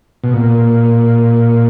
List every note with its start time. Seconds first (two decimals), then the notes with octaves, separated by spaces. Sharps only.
0.24 B2
0.34 A#2